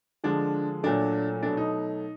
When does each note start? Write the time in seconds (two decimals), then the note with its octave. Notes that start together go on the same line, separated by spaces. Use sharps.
0.24 D3 F3 G#3 D4
0.83 A#2 F#3 A3 D4
1.43 B2 F#3 A3 D4
1.57 D#4